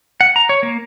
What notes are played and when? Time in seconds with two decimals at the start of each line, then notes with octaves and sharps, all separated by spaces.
0.21 F#5
0.36 A#5
0.49 C#5
0.63 A#3